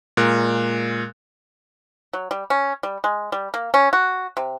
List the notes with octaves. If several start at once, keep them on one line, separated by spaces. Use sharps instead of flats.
A#2 G#3 A#4 F#6
F#3
G3
C#4
G3
G#3
G3
A#3
C#4
F#4
C3